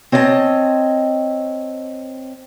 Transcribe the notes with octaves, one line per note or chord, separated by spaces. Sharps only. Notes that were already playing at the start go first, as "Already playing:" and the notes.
C4 C#5 D#5 E5 A5